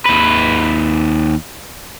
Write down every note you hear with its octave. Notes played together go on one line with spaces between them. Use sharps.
D#2 B4